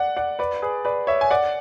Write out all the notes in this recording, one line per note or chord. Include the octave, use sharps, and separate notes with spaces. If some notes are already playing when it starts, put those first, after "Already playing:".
Already playing: D5 F#5
D5 F#5
B4 D5
G#4 B4
B4 D5
C#5 E5
G#5
D5 F#5